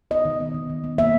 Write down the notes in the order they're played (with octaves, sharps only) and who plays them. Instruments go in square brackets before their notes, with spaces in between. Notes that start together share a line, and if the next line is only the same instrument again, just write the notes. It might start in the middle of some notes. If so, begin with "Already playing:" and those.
[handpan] B3 D#5
D#3
B3
D#3
D#3
B3
A#3 E5